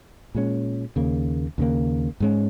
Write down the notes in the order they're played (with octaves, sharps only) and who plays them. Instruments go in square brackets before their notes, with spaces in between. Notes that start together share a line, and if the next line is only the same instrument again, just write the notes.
[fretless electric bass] A#2 G#3 C#4
D#2 C#3 A#3
D#2 C#3 A#3
G#2 G#3 C#4